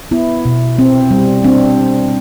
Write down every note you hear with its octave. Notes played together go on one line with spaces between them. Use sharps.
B3 E4
B2
C4
G3
C4 D4